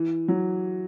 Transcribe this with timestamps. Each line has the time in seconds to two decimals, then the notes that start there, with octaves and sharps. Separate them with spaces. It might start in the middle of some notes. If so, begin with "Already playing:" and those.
Already playing: E3
0.28 F#3